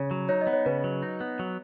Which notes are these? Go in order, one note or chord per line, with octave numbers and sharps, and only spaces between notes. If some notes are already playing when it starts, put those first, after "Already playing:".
Already playing: C#3 C#5
F#3
D#4 C#5
D#5
B3
C#5
C#3 B4
F#3
D#4
B3
F#3